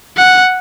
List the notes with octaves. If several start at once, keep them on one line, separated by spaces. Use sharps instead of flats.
F#5